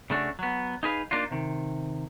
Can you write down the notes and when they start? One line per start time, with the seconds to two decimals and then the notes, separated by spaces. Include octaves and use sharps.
0.10 C#3 A3 D4 F#4
0.39 F#3 B3
0.83 D#4 G#4 B4 F5
1.11 A#3 D4 D#4 F4
1.31 C3 D#3